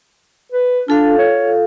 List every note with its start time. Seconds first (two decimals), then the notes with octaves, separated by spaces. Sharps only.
0.52 B4
0.88 D4 F4 A4 F5
1.18 C#5